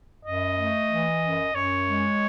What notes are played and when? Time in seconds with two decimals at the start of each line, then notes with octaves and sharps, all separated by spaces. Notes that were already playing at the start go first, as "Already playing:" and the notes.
0.25 F#2 D#5
0.58 A3
0.90 E3
1.23 F#2
1.54 F#2 C#5
1.87 G#3